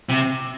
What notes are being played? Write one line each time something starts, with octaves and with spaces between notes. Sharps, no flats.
C3